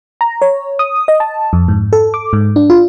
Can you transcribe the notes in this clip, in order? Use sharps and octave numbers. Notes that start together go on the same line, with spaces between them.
A#5
C#5
D#6
D#5
A5
F2
G#2
A4
D6
G#2
D4
F4